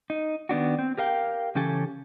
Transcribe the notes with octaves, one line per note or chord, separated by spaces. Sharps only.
D#4
D#3 B3 D4 F#4
C4
G4 A#4 F5 G5
C#3 E3 C#4 G4 A4 G#5